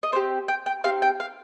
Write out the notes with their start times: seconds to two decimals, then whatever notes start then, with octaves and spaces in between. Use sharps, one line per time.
0.03 D#5
0.12 C4 D#4 G4 C5
0.48 G5
0.66 G5
0.84 C4 D#4 G4 F5
1.02 G5
1.20 F5